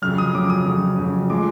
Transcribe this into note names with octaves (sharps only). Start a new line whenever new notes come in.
F2 C#3 F#3 F6
D#6
F2 C#3 F#3 D6
D#6
F2 C#3 F#3
F2 C#3 F#3
A2 F3 G#3 D6